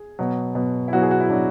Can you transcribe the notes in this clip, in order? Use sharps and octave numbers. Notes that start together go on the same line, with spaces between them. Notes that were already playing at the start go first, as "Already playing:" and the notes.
Already playing: G#4
B2 F#3
B2 F#3
E4
B2 F#3 F#4
G#4
F#4
E4
B2 F#3 D4